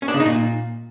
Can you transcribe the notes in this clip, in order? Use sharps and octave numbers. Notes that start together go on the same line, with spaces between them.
C#4
D4
C#3
D#4
A#2